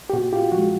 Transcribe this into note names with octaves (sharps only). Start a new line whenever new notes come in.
G4
A#2 F#4
F4 G4
F3 G#3 F#4